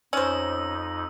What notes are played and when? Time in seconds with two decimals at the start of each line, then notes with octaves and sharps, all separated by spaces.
0.13 F2 C#4 D#4 C5 E6